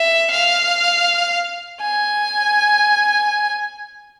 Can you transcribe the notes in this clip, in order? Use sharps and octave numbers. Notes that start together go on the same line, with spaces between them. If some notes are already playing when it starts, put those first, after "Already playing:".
Already playing: E5
F5
G#5